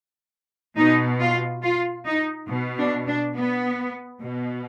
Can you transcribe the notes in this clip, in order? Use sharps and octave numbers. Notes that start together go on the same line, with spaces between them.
B2 D#4
F4
F4
D#4
B2
D4
D4
B3
B2